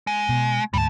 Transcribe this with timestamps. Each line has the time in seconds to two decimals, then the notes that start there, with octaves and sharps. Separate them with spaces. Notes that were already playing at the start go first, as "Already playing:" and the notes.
0.07 G#3
0.29 B2
0.74 D2 G#2 G3 A5